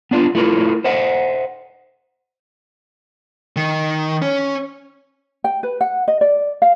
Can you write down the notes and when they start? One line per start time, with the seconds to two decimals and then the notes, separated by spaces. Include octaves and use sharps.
0.11 B3 D4 F4
0.35 A3 E4 F4 A#4
0.84 C5 D#5 E5 F#5
3.56 D#3
4.22 C#4
5.44 G5
5.63 B4
5.81 F#5
6.08 D#5
6.21 D5
6.62 F5